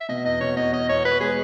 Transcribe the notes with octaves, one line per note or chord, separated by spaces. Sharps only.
E5
B2 D#5
E2 D#5
B2 C#5
E2 D#5
E2 D#5
E2 C#5
E2 B4
G#3 G#4